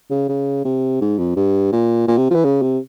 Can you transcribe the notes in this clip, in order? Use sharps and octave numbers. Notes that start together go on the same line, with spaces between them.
C#3
C#3
C3
G#2
F2
G2
A#2
A#2
C3
F3
E3
C#3
C3